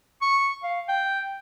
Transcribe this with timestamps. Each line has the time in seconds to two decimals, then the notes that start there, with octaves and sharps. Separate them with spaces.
0.21 C#6
0.63 F5
0.88 G5